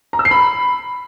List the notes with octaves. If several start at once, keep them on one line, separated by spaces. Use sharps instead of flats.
A#5
E6
C7
B5